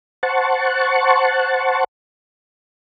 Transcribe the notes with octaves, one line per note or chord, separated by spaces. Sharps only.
C5 F#5 A5 C#6